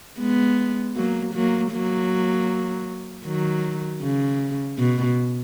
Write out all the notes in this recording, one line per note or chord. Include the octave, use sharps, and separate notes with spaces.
G#3 B3
F#3 A#3
F#3 A#3
F#3 A#3
D#3 F#3
C#3
B2